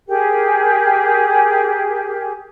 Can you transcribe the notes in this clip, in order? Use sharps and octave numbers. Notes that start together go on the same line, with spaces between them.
G4 G#4 A#4